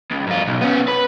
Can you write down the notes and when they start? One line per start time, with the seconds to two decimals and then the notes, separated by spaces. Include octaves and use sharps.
0.11 C#2
0.27 F#2 F4
0.47 B1
0.61 B3 C#4
0.88 B4